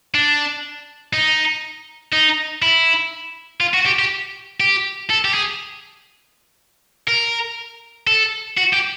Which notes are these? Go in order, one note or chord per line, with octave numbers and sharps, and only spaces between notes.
D4
D#4
D#4
E4
F4
F#4
G4
G4
G4
A4
G4
G#4
A#4
A4
F#4
G4